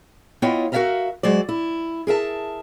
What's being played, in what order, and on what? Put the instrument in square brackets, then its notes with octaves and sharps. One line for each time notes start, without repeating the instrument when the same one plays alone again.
[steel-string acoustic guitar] B3 E4 F4 C#5 D#5 G5
F#4 A#4 C#5 E5 F5 A#5
F#3 G#3 C5 D5
E4
G#4 A#4 E5 A5